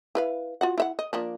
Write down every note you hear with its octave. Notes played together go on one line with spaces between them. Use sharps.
E4 B4 F5
F4 F#4 F#5
E4 E5 F#5
D#5
F3 A#3 D4